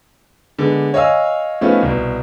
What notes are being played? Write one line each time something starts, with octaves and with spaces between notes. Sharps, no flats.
D3 G#3 B3
C#5 D#5 F5 G#5 E6
F3 A3 B3 C#4 D#4 F4
C2 B2